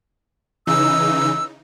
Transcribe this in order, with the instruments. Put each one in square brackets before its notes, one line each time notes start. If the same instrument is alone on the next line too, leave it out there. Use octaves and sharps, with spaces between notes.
[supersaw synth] C#3 E3 D#4 [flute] E6